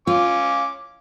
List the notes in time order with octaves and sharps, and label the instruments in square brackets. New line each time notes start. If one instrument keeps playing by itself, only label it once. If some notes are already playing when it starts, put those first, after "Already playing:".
[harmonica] C#4 D6 [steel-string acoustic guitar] F4